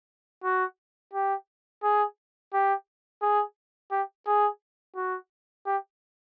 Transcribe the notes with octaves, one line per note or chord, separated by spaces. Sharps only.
F#4
G4
G#4
G4
G#4
G4
G#4
F#4
G4